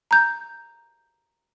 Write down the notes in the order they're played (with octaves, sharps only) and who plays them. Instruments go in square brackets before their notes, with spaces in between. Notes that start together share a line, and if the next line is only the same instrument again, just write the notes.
[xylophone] A#5 G6